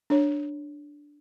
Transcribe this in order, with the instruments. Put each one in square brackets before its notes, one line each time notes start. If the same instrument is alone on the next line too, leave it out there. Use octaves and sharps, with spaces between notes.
[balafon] D4 C#5